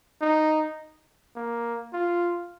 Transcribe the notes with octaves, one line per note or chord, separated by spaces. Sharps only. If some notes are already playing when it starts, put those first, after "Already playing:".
D#4
A#3
F4